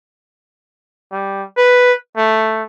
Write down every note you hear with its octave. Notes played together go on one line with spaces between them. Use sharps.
G3
B4
A3